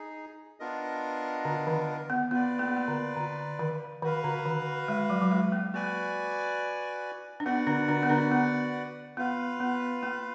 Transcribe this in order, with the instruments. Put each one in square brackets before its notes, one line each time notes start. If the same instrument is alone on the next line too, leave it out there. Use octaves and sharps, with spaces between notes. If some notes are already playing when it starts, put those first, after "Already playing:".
Already playing: [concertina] D#4 G#4
B3 D4 F4 A#4 D#5
[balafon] D3
D#3
B3
[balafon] B3 [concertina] F4 B4 D5
[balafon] A#3
B3
A#3
D3
D3
D#3
[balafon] D#3 [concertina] F#4 B4 F5
[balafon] D3
D#3
G#3
F#3
F#3
G#3
A#3
[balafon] A#3 [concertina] F#4 B4 D5 G#5
[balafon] D4
[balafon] B3 [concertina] F#4 B4 D5 F#5
[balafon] D3 D4
D3 D4
B3
D3 D4
B3
[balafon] B3 [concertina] F4 B4 F5
[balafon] B3
A#3